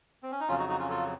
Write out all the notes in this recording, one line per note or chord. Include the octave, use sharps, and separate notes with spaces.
C4
C#4
D#4
F2 C#3 F#3 C#4 F4
D#4 F#4
D#4 F#4
C#4 F4
F4 A4